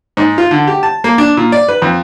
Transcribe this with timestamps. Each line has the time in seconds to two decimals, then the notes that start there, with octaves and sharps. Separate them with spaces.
0.17 G#2
0.38 F4
0.51 D3
0.67 G4
0.83 A5
1.04 A#3
1.18 D4
1.37 A#2
1.52 D5
1.69 B4
1.82 F2